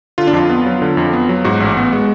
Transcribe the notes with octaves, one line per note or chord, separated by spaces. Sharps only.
D3 F4
D4
F2 F4
B3
F#3
D3
F2
B3
F#3
G#2 F#4
A1
B3
G#3